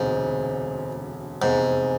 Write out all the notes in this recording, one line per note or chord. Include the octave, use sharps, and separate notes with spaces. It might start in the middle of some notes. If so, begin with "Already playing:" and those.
Already playing: E1 D2 G#2 C3
F1 E2 G#2 C3